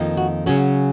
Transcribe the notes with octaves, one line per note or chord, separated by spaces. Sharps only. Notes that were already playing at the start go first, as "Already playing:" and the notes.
Already playing: F2 D#3 A#3 D#4
F#4
C#3 F#3 C#4 F#4